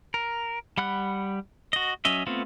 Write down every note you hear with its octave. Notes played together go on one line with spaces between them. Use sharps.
A#4
G3 F#5 B5 F#6
F#4 D#5
F#3 C#4 D#5 E5
A3 B3 C4 F4